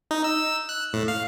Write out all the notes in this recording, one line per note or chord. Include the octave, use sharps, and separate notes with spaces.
D#4
E6
F#6
A2
F5